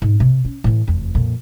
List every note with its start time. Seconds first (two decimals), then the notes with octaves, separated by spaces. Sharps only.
0.02 G#2
0.20 C3
0.45 C#4
0.64 A2 E3
0.88 F1 E2
1.15 F2 A#2